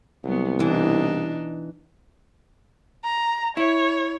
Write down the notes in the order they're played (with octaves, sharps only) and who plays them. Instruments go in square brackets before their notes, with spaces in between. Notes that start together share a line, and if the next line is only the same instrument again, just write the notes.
[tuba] C2 [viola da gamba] F#3 B3
[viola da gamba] B2 D4 D#4 [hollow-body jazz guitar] E3
[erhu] A#5
[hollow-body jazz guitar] E4 [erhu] C#5